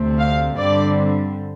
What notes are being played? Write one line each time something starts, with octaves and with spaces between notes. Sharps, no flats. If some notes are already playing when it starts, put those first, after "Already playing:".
Already playing: D2 C3 A3 C4
F5
G2 D3 G3 C4 D5